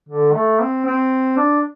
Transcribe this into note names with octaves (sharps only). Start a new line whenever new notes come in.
D3
A3
C4
C4
D4